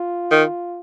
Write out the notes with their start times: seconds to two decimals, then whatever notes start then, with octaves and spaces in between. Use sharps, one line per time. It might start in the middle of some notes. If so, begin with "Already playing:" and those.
Already playing: F4
0.31 D#3